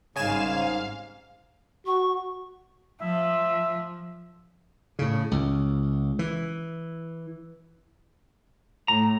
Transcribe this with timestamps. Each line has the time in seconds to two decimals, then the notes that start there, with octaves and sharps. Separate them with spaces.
0.16 G#1 G#2 C#3 G3 F5 G#5 E7
1.86 F#4 C#6
3.01 F3 E5
4.99 A2 C#3
5.31 C#2
6.19 E3
8.88 A2 A#5